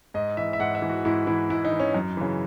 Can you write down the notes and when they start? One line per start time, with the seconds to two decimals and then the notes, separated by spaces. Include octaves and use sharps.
0.14 G#2 D#5
0.37 E3 E5
0.53 E5
0.60 G#2 F#5
0.75 E5
0.82 E3
0.89 F#4
1.05 G#2 E4
1.27 E3 E4
1.49 G#2 E4
1.65 D#4
1.73 E3
1.80 C#4
1.95 F#2
2.17 C#3 E3